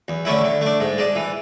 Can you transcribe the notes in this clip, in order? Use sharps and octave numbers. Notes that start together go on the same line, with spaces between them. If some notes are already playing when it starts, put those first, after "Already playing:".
E2
D3 A3 C#4 E4
D3
A3 D4
G#2
G#3 D4
E3